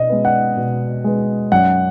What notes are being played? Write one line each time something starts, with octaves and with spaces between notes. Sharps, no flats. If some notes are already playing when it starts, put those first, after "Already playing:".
Already playing: B2 D#5
G#3 B3
F#5
B2
G#3 B3
F#2 F#5